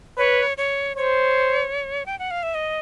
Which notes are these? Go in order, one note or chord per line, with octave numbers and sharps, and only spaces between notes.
B4 C#5
C#5
C5 C#5
G5
F#5
F5
E5
D#5